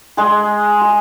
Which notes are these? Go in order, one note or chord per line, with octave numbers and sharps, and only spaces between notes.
G#3 G#4
G#4